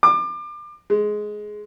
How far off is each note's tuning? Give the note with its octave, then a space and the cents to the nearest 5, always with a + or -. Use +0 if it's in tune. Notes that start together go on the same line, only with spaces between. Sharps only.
D6 +30
G#3 +10